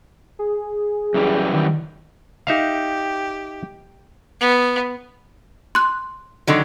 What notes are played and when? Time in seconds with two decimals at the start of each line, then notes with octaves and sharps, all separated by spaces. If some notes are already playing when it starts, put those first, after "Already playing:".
0.39 G#4
1.14 F#2 E3 G3
1.54 D#3
2.47 D#4 G4 E5 F5
4.40 B3
5.75 C6 F#6
6.47 D3 D#3 F#3